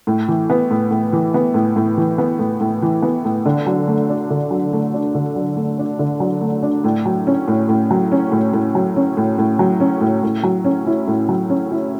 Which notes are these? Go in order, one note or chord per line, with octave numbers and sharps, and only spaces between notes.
A2
E3
B3
A2
A2
E3
B3
A2
A2
E3
B3
A2
A2
E3
B3
A2
D3
F#3
A3
D4
D3
F#3
A3
D4
D3
F#3
A3
D4
D3
F#3
A3
D4
A2
F#3
C#4
A2
A2
F#3
C#4
A2
A2
F#3
C#4
A2
A2
F#3
C#4
A2
A2
F#3
C#4
E4
A2
F#3
C#4
E4